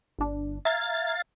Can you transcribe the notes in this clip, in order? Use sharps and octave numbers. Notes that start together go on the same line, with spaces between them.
G1 D4
E5 F5 A#5 G#6 A6